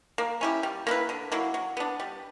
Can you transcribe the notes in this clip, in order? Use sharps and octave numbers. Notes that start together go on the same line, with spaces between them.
A#3
C#4 E4 G4
G3
A#3 E4 B4
D3
F#3 A#3 E4
F#3
B3 D4
G3